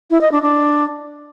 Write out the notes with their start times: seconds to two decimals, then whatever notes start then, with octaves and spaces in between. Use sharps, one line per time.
0.11 E4
0.21 D#5
0.32 D4
0.42 D4